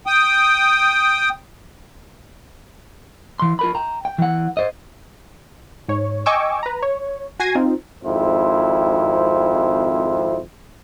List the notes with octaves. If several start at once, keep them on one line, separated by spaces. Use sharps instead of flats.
G5 D#6
E3 C6
F4 A#4 B5
G5 A#5
G5
E3 F#5
C5 D#5
G#2 C#5
D#5 G5 G#5 C#6 D6 E6
B4 A#5
C#5
F#4 G#5 G#6 A#6 C7 D#7
C4 D#4 F4
G#1 F2 G#2 E4 C5